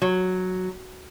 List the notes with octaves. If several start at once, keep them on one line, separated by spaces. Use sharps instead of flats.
F#3